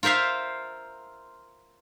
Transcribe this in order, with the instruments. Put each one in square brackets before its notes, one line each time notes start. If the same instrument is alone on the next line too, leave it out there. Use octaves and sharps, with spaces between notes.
[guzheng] F4 A#4 C5 E5 F5